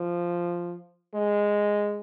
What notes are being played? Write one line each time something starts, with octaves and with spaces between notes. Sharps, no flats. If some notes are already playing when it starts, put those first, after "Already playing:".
Already playing: F3
G#3